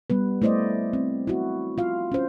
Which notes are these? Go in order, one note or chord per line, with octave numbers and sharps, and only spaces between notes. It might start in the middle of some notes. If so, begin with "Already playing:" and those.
G3 B3 B4
A3 E4 C5 D5 D#5
C4
E4 F#4
F4 F5
C#4 C5